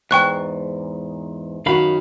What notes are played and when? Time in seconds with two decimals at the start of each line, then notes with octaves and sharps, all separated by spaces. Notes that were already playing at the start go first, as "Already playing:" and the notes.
0.11 E2 G#2 G5 C#6 F#6
1.66 F#2 D#3 F#4 F5 B5